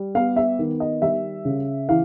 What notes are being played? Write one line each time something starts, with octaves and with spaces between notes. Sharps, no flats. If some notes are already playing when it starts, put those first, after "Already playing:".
Already playing: G3
B3 F5
E5
D#3
D#5
G3 E5
C#3
E3 F5